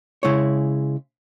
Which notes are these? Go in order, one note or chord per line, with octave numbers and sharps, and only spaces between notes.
C#3 G#3 E4 C#5